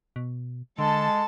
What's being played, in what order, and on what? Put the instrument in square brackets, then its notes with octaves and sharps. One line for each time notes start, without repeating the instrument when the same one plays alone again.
[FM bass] B2
[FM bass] D3 [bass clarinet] G#3 [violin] A4 A5